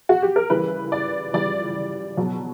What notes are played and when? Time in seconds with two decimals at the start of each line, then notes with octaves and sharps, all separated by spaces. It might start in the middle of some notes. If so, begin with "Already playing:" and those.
0.09 F#4
0.22 G4
0.36 A#4
0.50 C#3 E3 G3 B4
0.92 D5
1.33 C#3 E3 G3 D5
2.17 B2 F#3